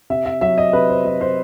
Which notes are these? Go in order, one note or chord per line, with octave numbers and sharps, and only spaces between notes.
C3 E5
E5
F#3 E5
D#5
C3 B4
C5
F#3 D#5
C5